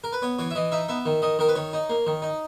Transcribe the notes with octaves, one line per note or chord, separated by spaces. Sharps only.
A#4
B4
B3 C#5
E3 C#5
E5
E3 D#5
D#4 E5
B3 E5
D#3
D#3 D#5
D#3 A#4
B4
D#3 C#5
D#4
A#3
D#3
D#4